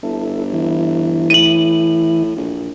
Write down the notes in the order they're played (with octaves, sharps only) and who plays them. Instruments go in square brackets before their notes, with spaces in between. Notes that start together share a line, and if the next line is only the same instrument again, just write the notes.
[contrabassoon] G1 [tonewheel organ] E4 A4
[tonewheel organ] E3 E4
[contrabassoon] A2 [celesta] D#7 F#7
[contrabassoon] A#1